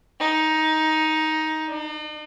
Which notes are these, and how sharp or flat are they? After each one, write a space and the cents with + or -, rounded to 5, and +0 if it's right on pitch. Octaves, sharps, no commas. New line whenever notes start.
D#4 +10
D#4 -45